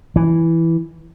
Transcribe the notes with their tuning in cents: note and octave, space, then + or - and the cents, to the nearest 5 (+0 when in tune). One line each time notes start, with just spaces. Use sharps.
E3 +0